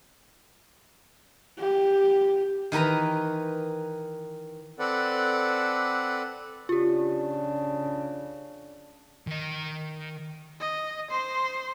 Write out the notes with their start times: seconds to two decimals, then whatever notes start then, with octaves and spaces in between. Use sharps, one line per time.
1.59 G4
2.72 D#3 E3 A#4 B4 A#5
4.79 C4 A4 B4 D5 F#5
6.69 C#3 D4 F4 G4
9.27 D#3 D#5
10.60 D#5
11.11 C5 C6